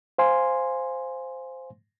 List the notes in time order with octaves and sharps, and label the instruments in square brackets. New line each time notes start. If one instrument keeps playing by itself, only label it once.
[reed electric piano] C5 F5 G#5 C6